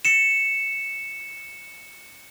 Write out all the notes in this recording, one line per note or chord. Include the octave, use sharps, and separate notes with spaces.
C#7 E7